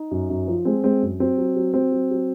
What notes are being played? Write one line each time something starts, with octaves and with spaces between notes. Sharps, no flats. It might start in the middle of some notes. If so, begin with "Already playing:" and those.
Already playing: D#4
F#2
F#2
F3
G#3 C4
G#3 C4
F#2
F#3 C4
F#3
F#3
F#3 C4
F#3
F#3